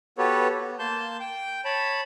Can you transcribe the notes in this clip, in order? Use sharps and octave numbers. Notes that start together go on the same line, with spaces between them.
B3 F#4 G4 A4 B4 C#5
B3
A#3 A5 C6 G6
G5 G6
C#5 A5 B5